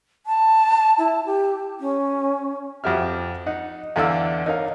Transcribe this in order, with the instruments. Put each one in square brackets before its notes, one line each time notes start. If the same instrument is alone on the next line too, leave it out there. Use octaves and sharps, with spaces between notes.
[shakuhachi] A5
E4
G4
C#4
[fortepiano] F2 F#4 G4 E5 F6
D#4 F#5
E2 D3 E3 D4 F5 E6
D#4 A#4 C#5 F5